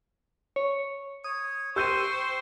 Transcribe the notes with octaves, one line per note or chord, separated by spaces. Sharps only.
C#5
C#5 D#6
G4 C5 G5 C6 C#6 E6 G6 D#7